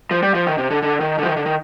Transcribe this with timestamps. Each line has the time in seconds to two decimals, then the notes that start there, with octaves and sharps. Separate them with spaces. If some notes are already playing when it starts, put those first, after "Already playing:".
0.11 F3
0.23 G3
0.35 F3
0.47 D#3
0.58 C3
0.71 D3
0.82 D3
1.00 D#3
1.19 D3
1.23 F3
1.27 D#3
1.37 D3
1.46 D#3